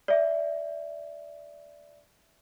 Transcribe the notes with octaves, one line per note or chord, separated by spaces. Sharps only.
D5 E5